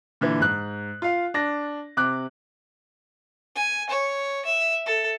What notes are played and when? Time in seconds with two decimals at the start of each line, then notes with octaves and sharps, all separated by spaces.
0.21 A#2 D3 E3
0.40 G#2 F#6
1.02 F4 F5
1.34 D4 A#6
1.97 C3 D6 F#6
3.56 G#5
3.90 C#5
4.46 E5
4.86 A4